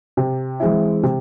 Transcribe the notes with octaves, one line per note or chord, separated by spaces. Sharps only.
C3
E3 G#3 C4 E4
C3